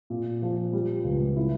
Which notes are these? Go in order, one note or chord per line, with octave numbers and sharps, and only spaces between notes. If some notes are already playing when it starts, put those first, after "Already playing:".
A#2
F3
G3
C#2
E4